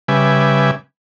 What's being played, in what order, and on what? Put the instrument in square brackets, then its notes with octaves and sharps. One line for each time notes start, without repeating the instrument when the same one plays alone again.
[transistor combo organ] C#3 G3 B4 E5 G#5 D6